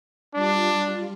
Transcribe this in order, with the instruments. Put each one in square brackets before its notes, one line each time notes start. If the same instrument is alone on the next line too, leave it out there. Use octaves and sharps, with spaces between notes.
[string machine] G3 F4 [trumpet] D4